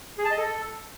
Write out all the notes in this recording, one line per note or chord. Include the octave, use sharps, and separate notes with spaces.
G#4
A5
D#5
A4